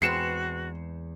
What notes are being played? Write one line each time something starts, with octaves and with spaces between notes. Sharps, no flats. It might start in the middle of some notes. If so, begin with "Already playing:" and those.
E2 G#3 C4 F#4 B4 C7 C#7 E7